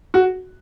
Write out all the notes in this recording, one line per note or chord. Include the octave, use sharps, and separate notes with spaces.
F#4